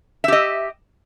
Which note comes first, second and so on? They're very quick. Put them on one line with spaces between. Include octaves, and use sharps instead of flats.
E5 G4 D#5